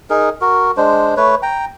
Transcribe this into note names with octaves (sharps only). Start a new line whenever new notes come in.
D#4 G#4 A#4
F#4 A#4
G#3 D4 C5
A3 B4 C#5
G5 A#5